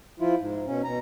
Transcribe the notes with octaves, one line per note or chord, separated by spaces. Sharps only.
F3 E4 F4
G#2
B2 C#4
B2 A#5